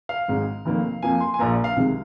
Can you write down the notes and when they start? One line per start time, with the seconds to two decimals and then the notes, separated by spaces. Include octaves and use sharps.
0.09 F5
0.28 G#1 G#2 G#3
0.65 F1 F2 D#3 A#3
1.03 F2 F3 A#3 G#5
1.20 C6
1.34 G#5
1.39 A#1 A#2 A#3 A#5
1.64 F5
1.76 C2 C3 D#3 G#3